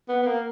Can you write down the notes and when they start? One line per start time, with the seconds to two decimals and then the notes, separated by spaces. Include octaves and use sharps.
0.09 B3
0.23 B3
0.26 A#3